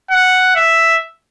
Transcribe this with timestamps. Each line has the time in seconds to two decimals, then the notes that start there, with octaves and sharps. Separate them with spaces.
0.11 F#5
0.56 E5